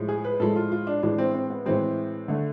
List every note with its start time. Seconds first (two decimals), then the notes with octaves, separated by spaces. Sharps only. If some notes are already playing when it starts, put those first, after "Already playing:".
Already playing: A2 F3 G#3
0.09 G#4
0.24 B4
0.40 A2 F3 G#3 A4
0.56 F4
0.72 F4
0.87 D4
1.03 A2 E3 G#3 D4
1.18 C4
1.35 C4
1.50 B3
1.66 A2 E3 G#3 C4
2.28 D3 A3